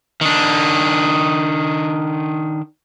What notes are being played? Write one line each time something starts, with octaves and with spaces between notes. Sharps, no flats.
D#3 D4